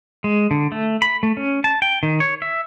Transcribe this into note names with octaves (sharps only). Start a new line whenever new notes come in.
G#3
D3
A3
B5
A3
C#4
A5
G5
D#3
C#5
E5